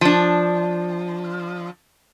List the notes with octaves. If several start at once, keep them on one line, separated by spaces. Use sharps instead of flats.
F3 D4